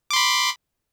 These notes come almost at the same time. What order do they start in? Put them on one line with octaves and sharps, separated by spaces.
D6 C6 B5